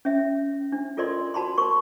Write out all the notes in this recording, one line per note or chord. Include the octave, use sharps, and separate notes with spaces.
C#4 E5
D4
F4 A4 A#4 D5 D#5 C6
F#4 A5 B5 C6
A#4 C6 C#6